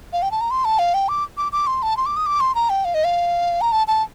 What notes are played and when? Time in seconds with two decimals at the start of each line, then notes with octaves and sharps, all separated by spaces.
0.13 F5
0.22 G5
0.31 A5
0.41 A#5
0.51 C6
0.65 A5
0.79 F5
0.94 G5
1.09 D6
1.37 D6
1.52 D6
1.67 C6
1.83 A5
1.97 C6
2.06 D6
2.17 D#6
2.26 D6
2.40 C6
2.55 A#5
2.70 G5
2.85 F5
2.94 D#5
3.04 F5
3.61 A#5
3.72 A5
3.88 A5